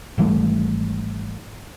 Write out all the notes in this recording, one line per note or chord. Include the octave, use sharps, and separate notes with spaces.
G#1 E3 G3 A3